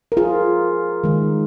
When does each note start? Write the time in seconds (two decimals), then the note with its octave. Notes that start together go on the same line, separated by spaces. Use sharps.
0.12 A#4
0.17 F4 G#4
1.04 D#3 G#3